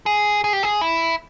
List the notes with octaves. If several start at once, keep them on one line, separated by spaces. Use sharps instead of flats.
G#4
G#4
G4
G#4
E4